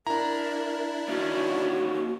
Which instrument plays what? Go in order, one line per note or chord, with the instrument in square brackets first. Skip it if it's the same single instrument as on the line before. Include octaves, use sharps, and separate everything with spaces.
[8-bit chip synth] D4 E4 [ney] A#4 [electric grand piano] A#5
[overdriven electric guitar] D#2 C#4 [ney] F#4